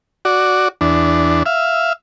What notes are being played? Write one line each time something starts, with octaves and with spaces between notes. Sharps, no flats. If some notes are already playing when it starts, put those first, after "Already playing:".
F#4 D5
E2 D4
E5 F5